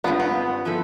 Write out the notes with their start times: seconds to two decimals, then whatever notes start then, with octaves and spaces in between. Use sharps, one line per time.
0.04 G2 D3 G3 B3 C4 F4
0.20 B3
0.65 F3 B3 E4 A4